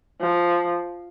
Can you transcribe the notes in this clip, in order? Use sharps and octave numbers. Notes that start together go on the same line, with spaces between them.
F3